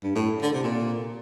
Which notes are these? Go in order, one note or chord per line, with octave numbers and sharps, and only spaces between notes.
G2
A2
D3
C3
A#2